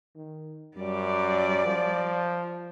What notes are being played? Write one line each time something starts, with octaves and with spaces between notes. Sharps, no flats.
D#3
F#2 G3 D5
F3